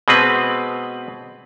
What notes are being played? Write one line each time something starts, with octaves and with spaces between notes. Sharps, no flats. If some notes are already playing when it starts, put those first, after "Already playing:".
B2 G#3 C4 B4